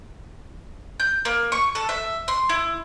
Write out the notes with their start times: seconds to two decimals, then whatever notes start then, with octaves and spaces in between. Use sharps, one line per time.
1.00 G6
1.25 A#3
1.52 C#6
1.75 A4
1.89 E5
2.28 C6
2.49 E4